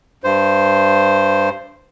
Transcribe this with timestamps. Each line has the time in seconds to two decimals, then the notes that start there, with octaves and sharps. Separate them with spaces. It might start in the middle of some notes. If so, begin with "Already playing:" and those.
0.24 G2 C5